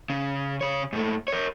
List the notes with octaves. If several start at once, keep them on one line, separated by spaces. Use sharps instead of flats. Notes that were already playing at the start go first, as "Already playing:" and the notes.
C#3
C#3 C#5
G#2 A3
A#4 C#5